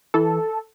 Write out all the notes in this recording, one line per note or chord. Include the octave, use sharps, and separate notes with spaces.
E3 A4